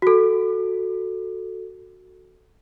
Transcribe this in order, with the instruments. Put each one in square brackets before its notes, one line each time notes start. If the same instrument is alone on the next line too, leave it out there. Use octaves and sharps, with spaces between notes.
[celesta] F#4 A4